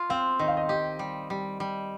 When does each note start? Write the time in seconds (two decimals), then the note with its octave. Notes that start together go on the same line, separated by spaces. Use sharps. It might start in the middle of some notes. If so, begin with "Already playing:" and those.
Already playing: F4
0.10 C4 F5
0.39 D#3 D#5
0.48 F5
0.57 D#5
0.69 G4 D#5
0.99 G3
1.30 G3
1.60 G3